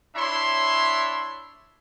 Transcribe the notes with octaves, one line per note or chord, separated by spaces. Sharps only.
D4 E4 C#5 E5 B5 C6